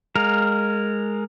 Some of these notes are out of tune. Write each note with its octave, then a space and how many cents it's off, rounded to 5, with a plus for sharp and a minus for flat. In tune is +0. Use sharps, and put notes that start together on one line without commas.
G#3 +0 A#4 -10 F5 +20